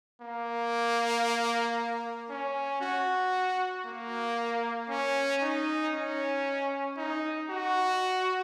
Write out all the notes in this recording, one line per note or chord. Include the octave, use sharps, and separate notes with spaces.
A#3
C#4
F#4
A#3
C#4
D#4
C#4
D#4
F#4